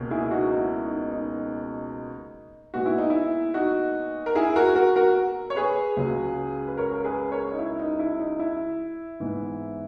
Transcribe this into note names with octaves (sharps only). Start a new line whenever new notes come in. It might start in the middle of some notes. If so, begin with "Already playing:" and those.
Already playing: C#2 B2 A#3 C#4
E4 G#4
D#4 F#4
D#4
E4
D#4
D#4
A#2 G#3 B3 F#4
E4
D#4
E4
D#4 F#4
A#4
E4 G#4
F#4 A#4
F#4 A#4
F#4 A#4
C#5
G#4 B4
C#2 C#3 F#3
B4
A#4 C#5
A#4
G#4 B4
A#4 C#5
D#4
E4
D#4
E4
D#4
E4
G#2 E3 B3